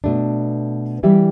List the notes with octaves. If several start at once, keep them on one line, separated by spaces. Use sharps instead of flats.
B2 A3 D4
E3 G3 E4 G4 E5